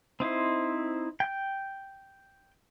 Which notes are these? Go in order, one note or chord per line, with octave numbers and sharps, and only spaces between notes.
C4 D#4 E4 C5
G5 G6